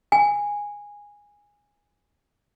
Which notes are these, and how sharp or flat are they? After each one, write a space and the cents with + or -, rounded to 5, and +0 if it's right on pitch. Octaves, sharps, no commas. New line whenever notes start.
G#5 -15